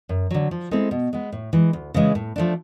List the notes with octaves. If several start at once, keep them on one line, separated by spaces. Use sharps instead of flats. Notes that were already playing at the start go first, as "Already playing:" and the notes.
F#2
D3 F#3
F3
G#3 C4 E4 A4
B2
G#3 B3
A2
E3 G#3
D2
C#3 E3 G#3
A2
F3 A3 D4